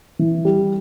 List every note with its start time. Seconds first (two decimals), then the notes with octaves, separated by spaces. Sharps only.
0.19 E3
0.45 G3